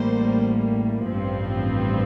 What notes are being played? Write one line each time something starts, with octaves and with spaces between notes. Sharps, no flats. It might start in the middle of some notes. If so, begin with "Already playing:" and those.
Already playing: A1 A2 G3 A#3 C5
A1 G2 F3 C4